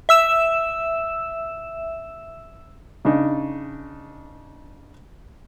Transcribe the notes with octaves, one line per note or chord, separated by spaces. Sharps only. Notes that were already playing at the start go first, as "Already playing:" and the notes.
E5 E6 E7
C#3 D4 D#4